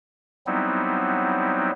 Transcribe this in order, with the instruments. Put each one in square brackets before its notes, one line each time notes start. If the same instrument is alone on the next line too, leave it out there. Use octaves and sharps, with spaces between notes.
[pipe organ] F#3 G3 B3 C4 D#4 E4